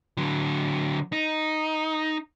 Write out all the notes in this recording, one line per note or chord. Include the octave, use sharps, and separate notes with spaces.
D3 F#3
D#4